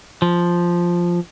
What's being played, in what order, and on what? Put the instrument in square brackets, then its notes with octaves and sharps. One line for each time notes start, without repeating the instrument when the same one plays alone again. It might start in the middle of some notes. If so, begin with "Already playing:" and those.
[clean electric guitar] F3